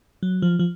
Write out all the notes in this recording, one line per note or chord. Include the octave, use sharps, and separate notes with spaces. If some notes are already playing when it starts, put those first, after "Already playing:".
F#3
F3
F3